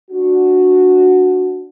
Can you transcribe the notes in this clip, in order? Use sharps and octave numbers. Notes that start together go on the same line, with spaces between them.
D4 F#4